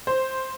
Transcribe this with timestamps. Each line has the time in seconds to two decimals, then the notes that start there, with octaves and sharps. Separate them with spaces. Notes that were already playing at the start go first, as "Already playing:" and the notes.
0.07 C5